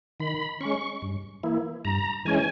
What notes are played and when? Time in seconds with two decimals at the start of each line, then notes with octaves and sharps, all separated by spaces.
0.20 D#3 B5
0.61 G#3 C#4 C#6
1.02 G2
1.43 E3 A#3 E4
1.85 G2 A#5
2.25 E3 G#3 C#4 G#5